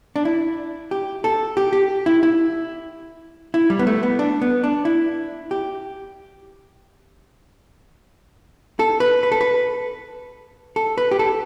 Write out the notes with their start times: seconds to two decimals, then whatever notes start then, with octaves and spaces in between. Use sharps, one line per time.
0.16 D4
0.25 E4
0.91 G4
1.24 A4
1.57 G4
1.73 G4
2.06 E4
2.23 E4
3.54 E4
3.70 G3
3.79 B3
3.87 A3
4.03 B3
4.19 D4
4.41 B3
4.64 D4
4.85 E4
5.51 G4
8.79 A4
9.00 B4
9.23 B4
9.32 A4
9.41 B4
10.76 A4
10.98 B4
11.11 G4
11.19 A4